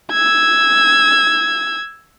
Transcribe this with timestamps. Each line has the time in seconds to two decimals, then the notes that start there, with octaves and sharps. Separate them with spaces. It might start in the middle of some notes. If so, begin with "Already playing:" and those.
0.12 E6 G#6